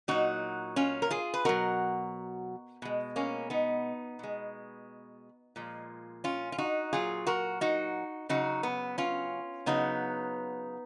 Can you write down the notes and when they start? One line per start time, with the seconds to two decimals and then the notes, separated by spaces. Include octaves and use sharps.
0.08 A#2 F#3 D#4 F#4
0.76 C#4 F4
1.02 A#4
1.11 F4 G#4
1.34 B4
1.45 B2 F#3 F#4 A#4
2.82 B2 G#3
3.16 A#3 C#4
3.50 B3 D#4
4.19 B2 G#3
5.56 A#2 F3 G#3
6.24 C#4 F4
6.52 F4
6.58 D#4 F#4
6.93 A#2 F#3 F4 G#4
7.27 F#4 A#4
7.61 D#4 F#4
8.29 C#3 F#3 D#4 F#4
8.63 B3
8.98 C#4 F4
9.66 C#3 F#3 B3 D#4